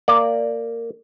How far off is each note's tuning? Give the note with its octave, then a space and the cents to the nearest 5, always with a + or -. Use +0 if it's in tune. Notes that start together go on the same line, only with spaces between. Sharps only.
A#3 -15 D5 +0